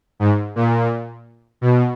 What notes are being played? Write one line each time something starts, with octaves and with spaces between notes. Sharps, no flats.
G#2
A#2
B2